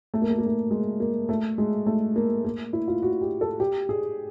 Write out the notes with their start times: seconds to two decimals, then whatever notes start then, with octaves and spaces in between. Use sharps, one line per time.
0.14 A3
0.22 A#3
0.30 A3
0.38 A#3
0.47 A3
0.71 G#3
1.00 A#3
1.29 A3
1.58 G#3
1.87 A3
2.16 A#3
2.44 A#3
2.73 E4
2.88 F4
3.02 F#4
3.21 G4
3.41 A4
3.60 G4
3.89 G#4